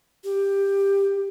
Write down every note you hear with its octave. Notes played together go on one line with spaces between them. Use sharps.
G4